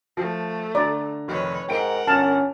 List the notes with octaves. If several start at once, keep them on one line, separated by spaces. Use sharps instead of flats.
F3 A3
D3 D5 A#5
F1 D#3 B4 C#5
G#2 A#4 F#5 G5 D7
G1 C#4 A5 F6